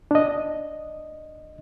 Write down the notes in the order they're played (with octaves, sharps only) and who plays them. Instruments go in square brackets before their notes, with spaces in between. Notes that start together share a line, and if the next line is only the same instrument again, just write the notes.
[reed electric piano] D4 D#5